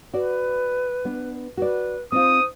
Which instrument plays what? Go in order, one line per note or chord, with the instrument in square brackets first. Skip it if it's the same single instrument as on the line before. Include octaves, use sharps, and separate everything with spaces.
[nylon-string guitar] F#4 D5 [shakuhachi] B4
[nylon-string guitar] B3 D4
[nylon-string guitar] F#4 D5 [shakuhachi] B4
[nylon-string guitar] C4 D#4 F4 [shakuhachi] C5 [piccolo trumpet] D#6